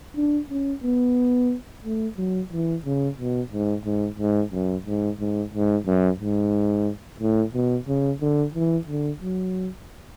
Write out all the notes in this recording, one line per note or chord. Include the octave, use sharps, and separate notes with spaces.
D4
C#4
B3
A3
F#3
E3
C#3
B2
G#2
G#2
G#2
F#2
G#2
G#2
G#2
F#2
G#2
A2
B2
C#3
D3
E3
D3
F#3